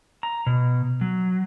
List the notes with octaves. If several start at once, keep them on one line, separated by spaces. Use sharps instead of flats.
A#5
B2
F#3